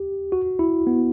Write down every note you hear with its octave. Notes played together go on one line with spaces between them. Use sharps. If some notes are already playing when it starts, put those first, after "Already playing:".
Already playing: G4
F#4
E4
B3